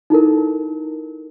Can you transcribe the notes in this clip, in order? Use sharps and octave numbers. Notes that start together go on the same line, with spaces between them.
D#4 E4 A4 A#4